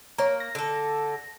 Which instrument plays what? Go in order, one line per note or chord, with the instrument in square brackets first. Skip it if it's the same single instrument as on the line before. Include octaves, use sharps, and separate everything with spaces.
[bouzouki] A#3 [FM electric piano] C#5 A#5
[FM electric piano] A#6
[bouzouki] D3 A4